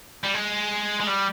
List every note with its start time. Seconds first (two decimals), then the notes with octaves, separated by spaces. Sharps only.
0.24 G3
0.34 G#3
1.01 G#3
1.07 G3